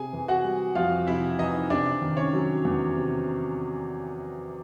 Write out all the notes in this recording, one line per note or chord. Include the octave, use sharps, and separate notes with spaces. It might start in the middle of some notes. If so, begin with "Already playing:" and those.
Already playing: C3 G#4 G#5
E3
F#4 F#5
G3
F2 F4 F5
C3 E4 E5
E3 D#4 D#5
C3 D4 D5
D#3
C#4 C#5
F#3
E2
C3